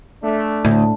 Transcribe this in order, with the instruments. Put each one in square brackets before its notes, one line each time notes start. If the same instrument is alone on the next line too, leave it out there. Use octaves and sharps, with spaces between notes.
[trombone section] A3 D4
[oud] D2 [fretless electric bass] A2